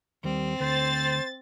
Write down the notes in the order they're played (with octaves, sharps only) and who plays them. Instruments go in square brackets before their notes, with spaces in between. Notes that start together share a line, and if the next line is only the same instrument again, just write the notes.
[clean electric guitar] D#2 G3 [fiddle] C4
[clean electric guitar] D2 [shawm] C5 [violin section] A6